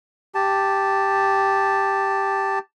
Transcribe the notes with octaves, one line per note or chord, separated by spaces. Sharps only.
G4 A5